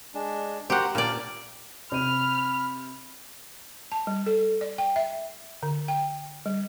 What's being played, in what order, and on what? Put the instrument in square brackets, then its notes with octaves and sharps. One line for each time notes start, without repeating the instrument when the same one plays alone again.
[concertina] G#3 D4
[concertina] F#4 A#4 C5 [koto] G4 F#5
[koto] A#2 D5 [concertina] A#3 D4 F6
[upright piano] C3 D#7 [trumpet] B5 [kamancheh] F6
[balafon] A5
G3
A4
D5
G5
E5
D3
G5
G3